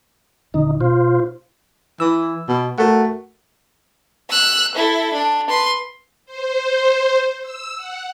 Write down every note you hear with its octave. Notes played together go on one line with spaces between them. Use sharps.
D#1 D3 C#4 D#4
B2 F4 C5
E3 E6
B2
A3 F#4 A#4 F#5
E6 F#6
E4 A4
D4
B4 C6
C5
E6
F#5